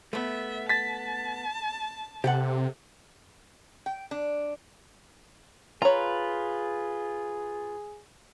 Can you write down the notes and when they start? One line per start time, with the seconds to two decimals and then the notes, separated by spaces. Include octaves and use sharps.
0.13 A3 B3 E5
0.69 A5 A6 B6
2.24 C3 G4 A4 F#5
3.86 G5
4.11 D4
5.82 F4 G#4 B4 C#5 A#5